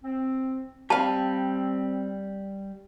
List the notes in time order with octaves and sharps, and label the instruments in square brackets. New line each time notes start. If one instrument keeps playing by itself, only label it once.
[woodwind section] C4
[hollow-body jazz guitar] G3 F5 [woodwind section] C4 [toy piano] A5